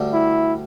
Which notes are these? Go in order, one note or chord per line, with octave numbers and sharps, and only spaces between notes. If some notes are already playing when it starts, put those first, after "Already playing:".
Already playing: D2 D3 G3
E4